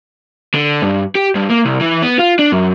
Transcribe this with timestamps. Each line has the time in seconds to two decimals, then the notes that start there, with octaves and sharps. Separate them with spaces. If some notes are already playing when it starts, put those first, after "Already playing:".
0.54 D3
0.82 G2
1.15 G4
1.35 G2
1.50 A#3
1.65 C2
1.81 E3
2.02 B3
2.19 F4
2.39 D4
2.52 F#2